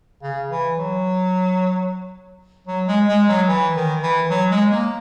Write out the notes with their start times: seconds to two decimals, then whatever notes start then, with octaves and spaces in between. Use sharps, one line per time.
0.23 C#3
0.50 E3
0.77 F#3
2.67 F#3
2.87 G#3
3.08 G#3
3.28 F#3
3.49 E3
3.75 D#3
4.03 E3
4.30 F#3
4.50 G#3
4.71 A#3